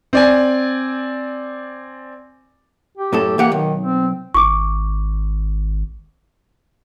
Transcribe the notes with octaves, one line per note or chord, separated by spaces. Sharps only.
C4 D5 G#5
G4
F#2 A2 A4
E3 A#3 G4 F#5
B1 D#3
C4
G#1 C#6 D6